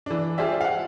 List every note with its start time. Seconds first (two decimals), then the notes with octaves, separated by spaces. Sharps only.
0.06 E3 D4
0.38 F4 G4 G#4 C5 D5 E5
0.61 F5 F#5